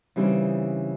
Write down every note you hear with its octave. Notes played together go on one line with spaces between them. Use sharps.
C#3 E3 G3 C4 D#4